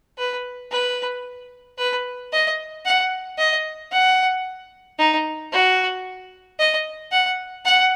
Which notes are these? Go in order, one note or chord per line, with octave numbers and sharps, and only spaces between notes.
B4
B4
B4
D#5
F#5
D#5
F#5
D#4
F#4
D#5
F#5
F#5